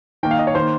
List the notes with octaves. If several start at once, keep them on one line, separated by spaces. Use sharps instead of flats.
D#3 A#3 G5
F5
D#5
C#5
D#3 A#3 C5